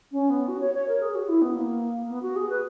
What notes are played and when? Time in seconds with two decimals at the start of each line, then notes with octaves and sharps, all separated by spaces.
0.12 C#4
0.30 B3
0.48 F#4
0.61 C#5
0.74 C#5
0.88 A#4
1.01 G#4
1.15 F#4
1.28 E4
1.42 B3
1.55 A#3
2.09 B3
2.22 F#4
2.36 G#4
2.50 B4